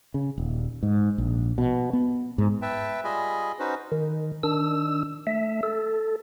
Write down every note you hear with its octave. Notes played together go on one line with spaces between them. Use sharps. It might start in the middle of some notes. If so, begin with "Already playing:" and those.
C#3
D#1
G#2
A#1
B2
B3
G#2
B4 E5 G5 A5
G3 F4 G#4 D#5 G#5 B5
C#4 D#4 F#4 B4 C5
D#3
D#3 D4 E6
A3 E5
A4